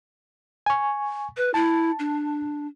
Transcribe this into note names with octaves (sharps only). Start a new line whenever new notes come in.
G#5 C#6
B4
E4 A5
D4